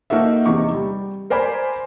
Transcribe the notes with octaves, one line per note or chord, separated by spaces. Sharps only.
A#3 D#4 F#4 A4 E5
E2 C3 D#4 C#6 D6
G3
A#4 C5 D5 G#5 A#5 B5